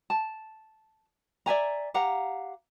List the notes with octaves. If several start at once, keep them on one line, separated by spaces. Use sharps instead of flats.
A5
D5 E5 G#5 A#5
G4 F5 F#5 A#5